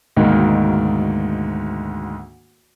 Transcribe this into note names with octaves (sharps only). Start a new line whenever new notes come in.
D2 G#2 B2 D#3 A#3